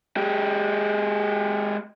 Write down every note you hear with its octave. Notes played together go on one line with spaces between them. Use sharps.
G#3 G4